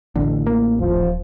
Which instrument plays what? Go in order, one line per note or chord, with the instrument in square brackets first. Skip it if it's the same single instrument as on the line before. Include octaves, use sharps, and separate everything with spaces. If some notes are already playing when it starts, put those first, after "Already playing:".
[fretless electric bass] A1 [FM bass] D3
[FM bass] A#3
[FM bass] D#1 [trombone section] F3